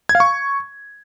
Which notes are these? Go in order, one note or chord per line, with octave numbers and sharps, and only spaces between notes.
G#6
F5
C#6